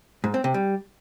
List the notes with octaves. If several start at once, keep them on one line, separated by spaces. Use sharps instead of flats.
G#2
C4
C3
G3